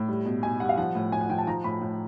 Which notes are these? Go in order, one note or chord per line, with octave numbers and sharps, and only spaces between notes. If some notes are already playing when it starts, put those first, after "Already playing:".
Already playing: A2
G3
B2
B2 G#5
G3 F#5
F5
F3 F#5
A2
A2 G#5
F#5
F3 G5
A5
F3 A#5
A2 B5
A2